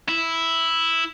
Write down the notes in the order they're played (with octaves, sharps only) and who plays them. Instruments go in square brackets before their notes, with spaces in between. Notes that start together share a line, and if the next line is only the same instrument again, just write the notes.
[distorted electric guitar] E4